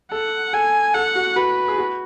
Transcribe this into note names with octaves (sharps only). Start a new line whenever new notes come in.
A4 F#5
A4 G#5
A4 F#5
F#4
F#4 B4
G#4
F#4